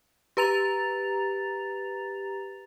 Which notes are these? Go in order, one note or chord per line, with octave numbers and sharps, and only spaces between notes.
G4 B4 A#5 A6 F7